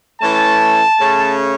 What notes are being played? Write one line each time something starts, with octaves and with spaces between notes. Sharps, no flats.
E3 A3 C#4 A5
C#3 A3 C#4